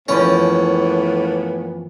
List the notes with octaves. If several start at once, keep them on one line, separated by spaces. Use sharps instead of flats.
F#2 A2 E3 F3 A#3 B3 C#4 C#5